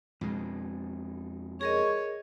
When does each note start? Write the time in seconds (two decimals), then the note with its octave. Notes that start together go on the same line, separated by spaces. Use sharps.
0.21 F2 B2 G#3
1.61 G#4 A#4 C#5 D#5